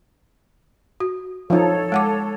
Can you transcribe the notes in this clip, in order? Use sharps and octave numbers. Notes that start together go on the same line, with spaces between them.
F#4
F3 D#4 A4 C#5
G#3 F#5 D6